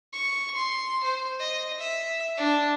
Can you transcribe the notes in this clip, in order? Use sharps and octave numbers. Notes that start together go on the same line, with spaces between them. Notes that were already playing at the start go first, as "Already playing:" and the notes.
C#6
C6
C5
D#5
E5
D4